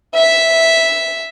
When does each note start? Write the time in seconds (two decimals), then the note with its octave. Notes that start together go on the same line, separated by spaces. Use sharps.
0.15 E5